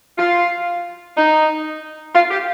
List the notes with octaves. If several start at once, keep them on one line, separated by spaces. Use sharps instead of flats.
F4
D#4
F4
G4